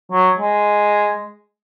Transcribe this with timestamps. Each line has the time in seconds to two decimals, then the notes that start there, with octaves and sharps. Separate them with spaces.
0.12 F#3
0.39 G#3